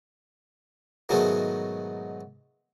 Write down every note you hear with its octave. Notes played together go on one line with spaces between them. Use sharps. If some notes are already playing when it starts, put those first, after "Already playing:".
G#2 B2 D#3 F#3 G#3 A3